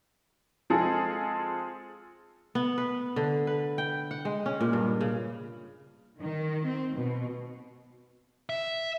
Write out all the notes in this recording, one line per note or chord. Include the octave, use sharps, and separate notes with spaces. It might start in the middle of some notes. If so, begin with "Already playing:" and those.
F3 G#3 C4 F4 G#4 A4
B3
B4
D3
B4
G5
F#5
G#3
C#4
A#2
G2
C#3
D#3
C4
B2
E5